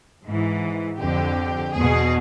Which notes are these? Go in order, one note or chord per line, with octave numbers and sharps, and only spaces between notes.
G#2 E3
F2 D3 G4
E2 B2 G#4